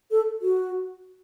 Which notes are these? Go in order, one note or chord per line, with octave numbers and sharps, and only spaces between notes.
A4
F#4